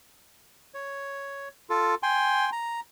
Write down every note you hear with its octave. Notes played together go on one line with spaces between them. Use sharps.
C#5
F4 A4
G5 G#5 C6
A#5